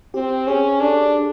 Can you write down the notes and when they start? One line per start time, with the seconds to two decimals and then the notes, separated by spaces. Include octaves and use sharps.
0.14 C4 G4
0.47 C#4 G#4
0.80 D4 A4